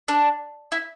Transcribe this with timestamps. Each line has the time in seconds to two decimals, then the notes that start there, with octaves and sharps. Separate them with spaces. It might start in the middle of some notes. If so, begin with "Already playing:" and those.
0.08 D4
0.72 E4